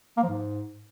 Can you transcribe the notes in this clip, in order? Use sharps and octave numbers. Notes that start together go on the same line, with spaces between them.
A#3
F3
G#2